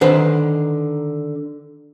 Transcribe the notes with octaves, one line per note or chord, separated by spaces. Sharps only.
D3 D#3 B4 C5